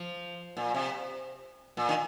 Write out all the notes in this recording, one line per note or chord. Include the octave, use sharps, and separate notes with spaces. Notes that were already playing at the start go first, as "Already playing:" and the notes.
Already playing: F3
A#2
C3
A#2
D#3